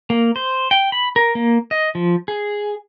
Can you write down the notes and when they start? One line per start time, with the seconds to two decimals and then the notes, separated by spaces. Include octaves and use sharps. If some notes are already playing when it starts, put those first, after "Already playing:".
0.10 A#3
0.36 C5
0.71 G5
0.92 B5
1.16 A#4
1.35 A#3
1.71 D#5
1.95 F3
2.28 G#4